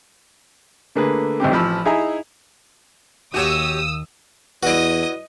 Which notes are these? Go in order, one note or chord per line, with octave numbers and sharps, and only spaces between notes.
D3 A3 A#3 G#4 B4
G#1 A2 C4 G4
A1 F3 B5 E6
D#4 E4 G#4 E5 G#5 A#5
D#2 F#4 G4 C#5 D#6 E6
E2 E4 F#4 B4 D5 D#5 D#6